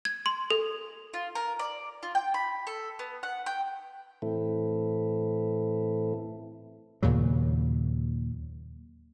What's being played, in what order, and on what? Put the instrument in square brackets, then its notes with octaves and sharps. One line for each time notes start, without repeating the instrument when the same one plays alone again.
[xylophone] G#6
C6
A4
[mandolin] F4
A#4
D5
F4
G5
B5
A4
B3
F#5
G5
[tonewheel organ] A2 E3 A3 C4 E4 A4
[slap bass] D#2 A#2 C#3 F#3